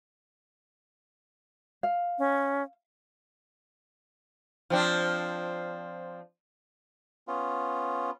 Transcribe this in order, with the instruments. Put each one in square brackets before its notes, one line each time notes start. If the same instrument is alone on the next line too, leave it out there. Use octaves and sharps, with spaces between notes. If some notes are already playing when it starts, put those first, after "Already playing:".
[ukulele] F5
[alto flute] C#4
[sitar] F3 C4 D4
[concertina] B3 C#4 F4